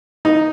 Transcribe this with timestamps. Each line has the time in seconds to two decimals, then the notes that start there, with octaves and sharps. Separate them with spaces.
0.25 D#4